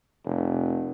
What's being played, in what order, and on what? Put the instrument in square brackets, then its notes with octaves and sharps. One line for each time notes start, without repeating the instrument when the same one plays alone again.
[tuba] F1